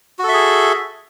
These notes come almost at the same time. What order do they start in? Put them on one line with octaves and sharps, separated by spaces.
F#4 A4 E5 G#4